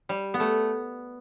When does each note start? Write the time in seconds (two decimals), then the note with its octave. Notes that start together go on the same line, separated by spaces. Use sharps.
0.09 G3
0.34 B3
0.40 A3